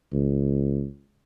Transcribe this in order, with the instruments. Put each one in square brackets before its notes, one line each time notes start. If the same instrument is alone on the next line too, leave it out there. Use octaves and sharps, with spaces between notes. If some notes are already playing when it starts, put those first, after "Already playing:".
[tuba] C#2